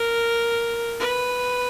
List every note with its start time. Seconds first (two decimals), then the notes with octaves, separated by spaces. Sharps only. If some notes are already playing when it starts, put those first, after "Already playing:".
Already playing: A#4
1.00 B4